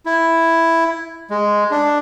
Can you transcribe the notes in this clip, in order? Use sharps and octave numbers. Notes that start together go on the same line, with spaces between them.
E4
G#3
D4